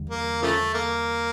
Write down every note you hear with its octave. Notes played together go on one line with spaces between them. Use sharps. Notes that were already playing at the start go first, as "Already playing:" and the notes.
Already playing: E2 D3 G3
A#3
C#3 F3 A3
A#3